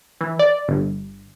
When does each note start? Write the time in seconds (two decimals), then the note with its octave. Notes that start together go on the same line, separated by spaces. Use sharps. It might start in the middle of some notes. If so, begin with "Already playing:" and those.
0.21 E3
0.39 D5
0.68 G1